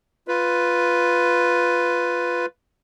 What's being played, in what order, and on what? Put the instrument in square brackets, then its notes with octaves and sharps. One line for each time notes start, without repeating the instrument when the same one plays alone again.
[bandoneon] F4 B4